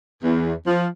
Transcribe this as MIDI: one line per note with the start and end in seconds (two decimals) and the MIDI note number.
0.23 0.54 40
0.67 0.87 53